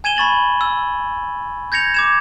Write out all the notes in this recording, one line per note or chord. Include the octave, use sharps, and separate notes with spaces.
G#5 G#6 D#7 E7 G7
B5 C#6 A6 F#7
E6
G6 G#6 A#6 C#7 F7
D6 G#6 E7